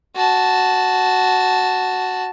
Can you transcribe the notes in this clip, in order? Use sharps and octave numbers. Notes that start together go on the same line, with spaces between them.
F#4 A5